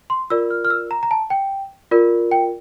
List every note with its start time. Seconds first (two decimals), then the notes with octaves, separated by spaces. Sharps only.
0.10 C6
0.30 F4 A#4 D5 E6
0.50 F6
0.65 F6
0.70 E6
0.91 A#5
1.03 A#5
1.11 A5
1.30 G5
1.91 F4 A#4 D5
2.32 G5